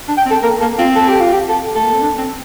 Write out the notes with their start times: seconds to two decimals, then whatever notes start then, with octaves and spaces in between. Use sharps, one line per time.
0.08 D4
0.18 G5
0.26 C4
0.31 A4
0.43 A#3 A#4
0.60 A#3 A4
0.79 C4 F4
0.96 A4
1.08 G4
1.20 F4
1.33 G4
1.49 A4
1.75 A3 A4
1.84 A#3
1.93 C4
2.01 D4
2.18 C4